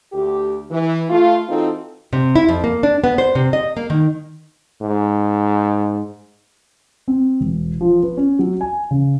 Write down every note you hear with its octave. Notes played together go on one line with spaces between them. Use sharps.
D2 G4
E3
A3 F4
E3 C4 D#4 F4 F#4 A4
C3
E4
F2
A#3
D4
B3
C5
C3
D#5
A#3
D#3
G#2
C4
E1
F3
B4
C#4
F#3
G#5
C#3